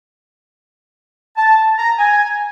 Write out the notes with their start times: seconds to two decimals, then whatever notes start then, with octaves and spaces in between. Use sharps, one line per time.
1.37 A5
1.78 A#5
1.98 G#5